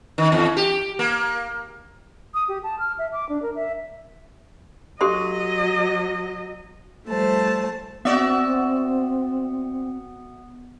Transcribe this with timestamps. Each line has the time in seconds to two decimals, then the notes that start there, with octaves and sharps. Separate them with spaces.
0.18 D#3
0.32 E2
0.57 G4
0.99 A#3
2.34 D#6
2.48 G4
2.63 A5
2.79 F6
2.99 E5
3.13 D6
3.29 D4
3.42 A#4
3.55 E5
5.01 F#3 G4 A4 D#5 C6
7.06 F3 G3 A3 C5 A5
8.05 B3 C4 F#4 D5 E5